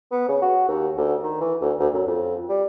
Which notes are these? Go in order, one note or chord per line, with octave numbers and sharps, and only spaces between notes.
B3
C#3
F#4
D#2
D2
D#3
E3
D2
D2
F#2
F2
G3